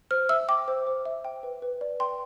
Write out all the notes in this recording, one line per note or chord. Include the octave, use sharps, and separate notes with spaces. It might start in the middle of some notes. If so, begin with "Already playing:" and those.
C5 F6
E5 E6
G5 D6
C5
C5
E5
G5
B4
B4
D5
G5 C6